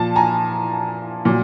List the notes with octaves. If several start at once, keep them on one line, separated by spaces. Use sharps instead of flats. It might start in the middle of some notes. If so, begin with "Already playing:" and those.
Already playing: A#2 F3 A5
G#5 A#5
A#2 F#3